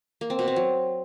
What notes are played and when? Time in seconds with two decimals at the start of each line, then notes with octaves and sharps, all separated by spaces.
0.21 A#3
0.30 C4
0.39 B2
0.48 C4
0.56 F#3